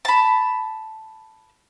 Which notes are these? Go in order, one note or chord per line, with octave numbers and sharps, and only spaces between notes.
A5 B5